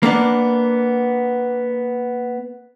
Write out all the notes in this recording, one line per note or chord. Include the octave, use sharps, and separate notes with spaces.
A#3 B3 D4